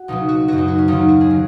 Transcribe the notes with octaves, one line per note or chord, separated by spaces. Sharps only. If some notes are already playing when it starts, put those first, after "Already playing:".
Already playing: F#4
C#2 B2 F#3 D#4
F#4
F#2 F#3 F#4
D#4
F#4
C#4
D#2 D#3 F#3 D#4
F#4
G#4
D#3 F#3